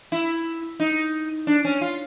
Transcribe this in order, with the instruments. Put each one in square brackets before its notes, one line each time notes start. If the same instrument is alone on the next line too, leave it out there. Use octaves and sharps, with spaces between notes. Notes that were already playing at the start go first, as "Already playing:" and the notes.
[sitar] E4
D#4
D4
C#4
F4